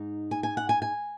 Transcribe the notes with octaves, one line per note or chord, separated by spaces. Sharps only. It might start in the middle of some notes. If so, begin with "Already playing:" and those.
Already playing: G#2 D#4
G#5
G#5
F#5
G#5
G#5